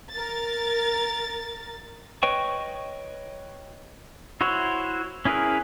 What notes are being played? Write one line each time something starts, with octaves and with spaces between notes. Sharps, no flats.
A#4 A6
B4 C#5 D#5 G5 C#6
E4 F#4 C5 C#5
C#4 E4 G#4 A#4 B4